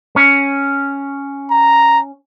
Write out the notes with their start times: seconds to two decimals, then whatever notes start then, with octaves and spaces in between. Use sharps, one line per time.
0.16 C#4
1.51 A#5